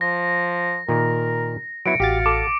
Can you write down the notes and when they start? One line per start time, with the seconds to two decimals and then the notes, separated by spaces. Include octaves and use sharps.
0.01 F3 A#6
0.89 A#2 D#3 A#4
1.86 F#3 B3 E4 C#7 D7
2.00 A1 F#4 G4 F5 A6
2.26 A4 D6